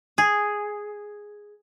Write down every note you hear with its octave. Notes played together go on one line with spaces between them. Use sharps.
G#4